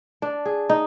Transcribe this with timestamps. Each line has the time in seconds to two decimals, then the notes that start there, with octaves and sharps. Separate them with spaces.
0.22 D4
0.45 G#4
0.69 D#4